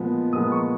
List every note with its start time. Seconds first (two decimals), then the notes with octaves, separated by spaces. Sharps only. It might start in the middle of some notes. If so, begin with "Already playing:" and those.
Already playing: A#2 F3 G#3 B3
0.33 A#2 F3 G#3 B3 D#6
0.52 C#6